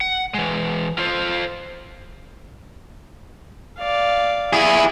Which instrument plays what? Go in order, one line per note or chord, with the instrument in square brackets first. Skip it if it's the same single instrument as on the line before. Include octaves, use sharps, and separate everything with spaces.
[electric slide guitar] F#5
E3 G#3
F4 A4 C5
[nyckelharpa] D5 F5
[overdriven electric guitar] E4 G#4